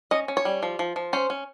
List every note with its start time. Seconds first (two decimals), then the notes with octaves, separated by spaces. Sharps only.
0.11 C#4 D#5
0.28 C#4
0.37 C#5
0.45 G3
0.63 F3
0.79 F3
0.96 F3
1.13 C#4 C5
1.30 C#4